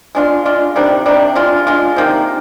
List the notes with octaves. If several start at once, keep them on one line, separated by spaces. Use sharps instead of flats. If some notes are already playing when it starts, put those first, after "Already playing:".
G#3 D4 F4
G#3 D4 F4
C3 D#3 G3 D4
C3 D#3 G3 D4
G#3 D4 F4
G#3 D4 F4
C3 D#3 A#3